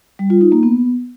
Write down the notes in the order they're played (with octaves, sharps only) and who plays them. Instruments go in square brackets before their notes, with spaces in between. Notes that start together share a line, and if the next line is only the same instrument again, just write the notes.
[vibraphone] G3
F4
D#4
A#3
B3